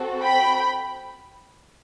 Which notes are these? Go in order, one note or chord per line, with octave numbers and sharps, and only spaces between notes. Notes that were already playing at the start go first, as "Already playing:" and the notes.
Already playing: C4 F#4 A4
G5 B5